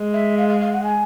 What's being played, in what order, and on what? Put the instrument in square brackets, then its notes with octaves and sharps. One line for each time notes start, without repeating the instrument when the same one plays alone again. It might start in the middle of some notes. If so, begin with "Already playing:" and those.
Already playing: [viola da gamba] G#3
[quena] E5
F5
F5
F5
F#5
G#5